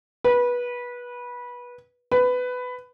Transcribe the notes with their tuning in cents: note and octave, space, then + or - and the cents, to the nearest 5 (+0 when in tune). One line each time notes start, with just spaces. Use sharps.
B4 -20
B4 +15